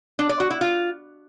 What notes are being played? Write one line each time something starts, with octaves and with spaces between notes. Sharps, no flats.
D4
D5
F#4
E4
F4